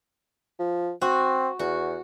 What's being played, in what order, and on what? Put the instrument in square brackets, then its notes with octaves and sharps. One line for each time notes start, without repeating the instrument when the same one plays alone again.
[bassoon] F3
[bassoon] C4 [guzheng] F#4
[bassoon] E2 [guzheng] F#4